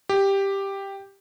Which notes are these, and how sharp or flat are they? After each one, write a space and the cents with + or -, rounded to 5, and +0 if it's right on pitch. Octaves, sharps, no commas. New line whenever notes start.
G4 +5